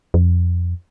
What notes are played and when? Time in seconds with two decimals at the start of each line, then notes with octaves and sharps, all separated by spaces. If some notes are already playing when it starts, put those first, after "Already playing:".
0.14 F2